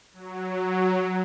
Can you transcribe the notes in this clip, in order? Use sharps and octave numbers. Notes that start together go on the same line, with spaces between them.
F#3